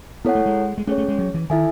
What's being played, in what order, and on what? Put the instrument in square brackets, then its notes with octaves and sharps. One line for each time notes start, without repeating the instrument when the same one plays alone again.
[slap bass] B3 [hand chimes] E4 A4 C#5 F#5
[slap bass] A3
G#3
G#3
[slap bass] A3 [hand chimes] C#4 G#4 C#5
[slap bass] A3
G#3
F#3
E3
[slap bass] D#3 [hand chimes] E4 A4 E5 G#5